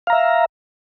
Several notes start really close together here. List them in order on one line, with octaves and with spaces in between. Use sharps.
F5 A#5 E5